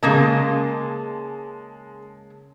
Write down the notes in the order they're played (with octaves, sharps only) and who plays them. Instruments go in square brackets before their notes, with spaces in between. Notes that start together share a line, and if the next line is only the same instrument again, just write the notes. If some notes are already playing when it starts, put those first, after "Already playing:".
[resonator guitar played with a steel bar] C#3 A#3 D#5 [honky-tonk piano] G#3 A5